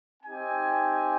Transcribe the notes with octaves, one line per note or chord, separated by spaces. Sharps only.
C4 D#4 G4 G#5